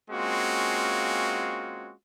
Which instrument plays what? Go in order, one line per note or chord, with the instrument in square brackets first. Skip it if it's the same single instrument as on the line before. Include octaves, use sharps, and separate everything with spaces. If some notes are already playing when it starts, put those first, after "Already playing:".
[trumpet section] G#3 A#3 C4 C#4 F4 F#4